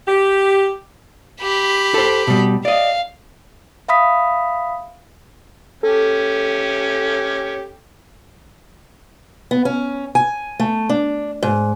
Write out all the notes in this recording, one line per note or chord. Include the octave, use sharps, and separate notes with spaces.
G4
G4 B5
A4 C5
B2 G3
D5 D#5 F5
E5 F5 B5 D#6 B6
C#4 G4 A4
B3
C#4
G#5
A3
D4
G#2